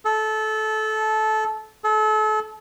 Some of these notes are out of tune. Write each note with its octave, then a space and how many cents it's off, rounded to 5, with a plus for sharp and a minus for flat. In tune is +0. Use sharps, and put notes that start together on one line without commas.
A4 -20
A4 -35